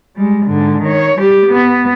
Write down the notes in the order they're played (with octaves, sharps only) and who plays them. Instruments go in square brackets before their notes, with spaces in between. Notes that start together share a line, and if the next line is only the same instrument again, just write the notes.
[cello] G3 G#3
G#2 D3
D#3 C#5
G3 G4
B3